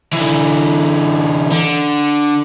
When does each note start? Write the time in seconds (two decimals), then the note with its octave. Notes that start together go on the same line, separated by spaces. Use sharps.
0.13 D3 E3
1.52 D3